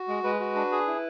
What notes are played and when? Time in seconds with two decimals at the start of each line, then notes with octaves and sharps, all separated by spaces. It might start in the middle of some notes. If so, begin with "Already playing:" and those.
Already playing: F#4
0.08 G#3
0.24 G#3 B4
0.40 F#4
0.56 D4
0.72 G#4
0.87 E4